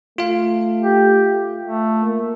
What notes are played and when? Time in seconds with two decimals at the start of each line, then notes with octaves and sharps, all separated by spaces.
0.18 A3 F4 F5
0.81 G4
1.63 A3
2.02 A#3